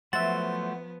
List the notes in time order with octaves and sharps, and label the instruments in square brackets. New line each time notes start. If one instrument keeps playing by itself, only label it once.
[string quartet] F3 B3 [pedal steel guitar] F#3 A3 C5 [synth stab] E5 F#5 [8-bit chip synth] A6